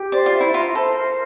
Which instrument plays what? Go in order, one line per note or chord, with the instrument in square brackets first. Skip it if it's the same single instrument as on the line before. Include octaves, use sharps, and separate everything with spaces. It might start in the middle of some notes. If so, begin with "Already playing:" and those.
Already playing: [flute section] G4
[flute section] C5 [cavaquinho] D5
[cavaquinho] F4
[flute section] E5
[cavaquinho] E4
[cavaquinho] F4 [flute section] A#5
[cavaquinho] A4 [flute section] C5
[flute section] A#4